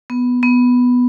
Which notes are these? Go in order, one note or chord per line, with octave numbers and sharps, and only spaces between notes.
B3
B3